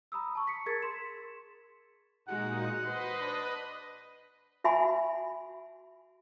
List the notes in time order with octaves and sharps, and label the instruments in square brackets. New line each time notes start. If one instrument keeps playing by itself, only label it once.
[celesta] A#5 B5 D#6 E6
A5 C#6
B6 C#7
G#4 A#4 G#6 A6 C#7
C6 B6 E7
[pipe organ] A#2 D#4 [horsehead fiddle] G#3 F#4 [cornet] F#5
[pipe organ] B4 D#5 [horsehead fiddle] C5
[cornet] D4
[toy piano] F#4 E5 G#5 B5